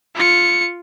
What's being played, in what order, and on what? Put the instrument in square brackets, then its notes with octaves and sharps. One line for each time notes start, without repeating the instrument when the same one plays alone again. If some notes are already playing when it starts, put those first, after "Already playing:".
[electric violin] F4 C#7